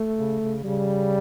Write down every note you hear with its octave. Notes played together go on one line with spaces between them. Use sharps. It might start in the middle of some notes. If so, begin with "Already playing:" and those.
Already playing: A3
C#3
C#3
C#3 G3